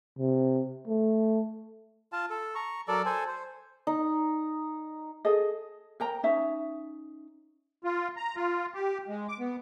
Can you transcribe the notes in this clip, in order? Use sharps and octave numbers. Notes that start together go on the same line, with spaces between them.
C3
A3
F4 F5 A5
A4
A#5 C#6
F#3 A4 A#4 D5
A4 C5 G#5
C5
D#4
G#4 A4 D#5
A#4 G5 A#5
C#4 D#4 E5
F4
A#5
F4
G4
G#3
D6
B3